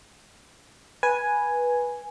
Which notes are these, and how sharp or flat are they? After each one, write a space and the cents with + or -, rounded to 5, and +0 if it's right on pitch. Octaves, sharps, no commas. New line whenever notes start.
B4 -15 G#5 +0